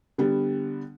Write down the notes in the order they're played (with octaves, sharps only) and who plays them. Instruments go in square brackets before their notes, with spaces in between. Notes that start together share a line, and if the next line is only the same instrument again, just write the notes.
[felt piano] D3 G3 B3